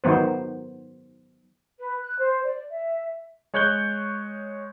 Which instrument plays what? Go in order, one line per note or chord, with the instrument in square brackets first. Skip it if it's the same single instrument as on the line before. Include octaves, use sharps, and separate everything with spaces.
[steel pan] D#3 F#3 B3 C5
[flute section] B4
F#6
C5
D5
E5
[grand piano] G#3 C#5 F#6 G6 G7